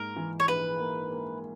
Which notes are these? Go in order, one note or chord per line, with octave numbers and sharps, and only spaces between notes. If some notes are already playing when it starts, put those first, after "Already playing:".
Already playing: G#2 A#3 A#4
E3
C#5
A#1 B4
A#3
A#3